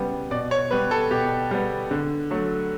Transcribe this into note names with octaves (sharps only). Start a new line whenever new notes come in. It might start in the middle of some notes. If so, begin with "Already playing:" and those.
Already playing: C#3 G3 B3
B2 D5
C#5
G3 B3 B4
A4
B2 G4
G3 B3
D3
F#3 A3